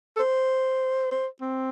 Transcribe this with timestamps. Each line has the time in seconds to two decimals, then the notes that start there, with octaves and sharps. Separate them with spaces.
0.16 A4
0.20 C5
1.11 C5
1.41 C4